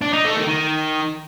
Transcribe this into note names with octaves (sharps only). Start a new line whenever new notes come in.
D4
D#4
A3
D#3
D#3